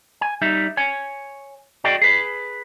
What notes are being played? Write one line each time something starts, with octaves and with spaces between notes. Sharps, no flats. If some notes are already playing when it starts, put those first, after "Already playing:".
G#5
G3 D#4 E5
C#5 G#5
F#4 G#4 D5 D#5 G5
G#4 B4